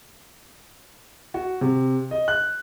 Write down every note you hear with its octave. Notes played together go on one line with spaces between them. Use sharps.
F#4
C3
D#5
F#6